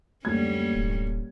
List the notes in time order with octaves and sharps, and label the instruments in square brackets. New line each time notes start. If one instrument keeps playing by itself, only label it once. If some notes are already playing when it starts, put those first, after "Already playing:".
[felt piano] F#1 D2 G#6 [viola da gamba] G3 A#3 C#4
[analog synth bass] D1